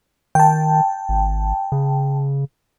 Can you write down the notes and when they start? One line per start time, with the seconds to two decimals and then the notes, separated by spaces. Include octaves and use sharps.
0.35 D#3 G5 A5
1.09 G#1
1.72 C#3